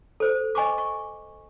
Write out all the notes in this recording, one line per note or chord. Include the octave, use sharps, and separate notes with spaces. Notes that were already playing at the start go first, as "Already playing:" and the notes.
A4 C5
D#5 G#5 C#6 D6
C#6